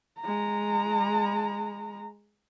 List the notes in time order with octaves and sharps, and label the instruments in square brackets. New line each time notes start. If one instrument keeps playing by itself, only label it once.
[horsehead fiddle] G#3 A#5